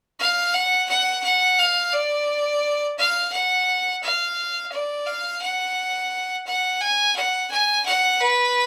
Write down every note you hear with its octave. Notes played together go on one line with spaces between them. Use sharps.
F5
F#5
F#5
F#5
F5
D5
F5
F#5
F5
D5
F5
F#5
F#5
G#5
F#5
G#5
F#5
B4